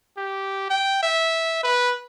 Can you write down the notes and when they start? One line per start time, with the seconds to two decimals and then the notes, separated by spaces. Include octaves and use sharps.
0.17 G4
0.70 G5
1.03 E5
1.63 B4